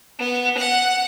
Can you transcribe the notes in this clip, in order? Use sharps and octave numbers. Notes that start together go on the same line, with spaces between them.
B3
F#5